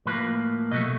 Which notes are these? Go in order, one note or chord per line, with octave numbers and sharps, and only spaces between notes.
A2 F3 A#3 B4
C2 B2 F#3 A3 D#5